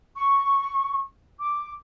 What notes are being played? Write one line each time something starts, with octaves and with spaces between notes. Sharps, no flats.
C#6
D6